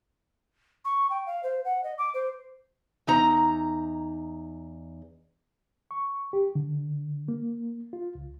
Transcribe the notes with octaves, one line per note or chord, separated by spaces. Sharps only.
C#6
G5
F5
C5
F#5
D#5
D6
C5
E2 D#4 A#5
C#6
G4
D3
A#3
F4
C#2